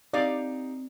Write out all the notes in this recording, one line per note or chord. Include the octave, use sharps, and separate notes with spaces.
C4 D#4 G4 D5 F5